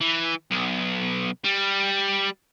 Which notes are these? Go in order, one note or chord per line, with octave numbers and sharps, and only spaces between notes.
E3
B1
G3